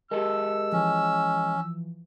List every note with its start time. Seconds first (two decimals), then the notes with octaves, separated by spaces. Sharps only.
0.11 G#3 G4 A4 A#4 E6
0.72 E3 F3 C#4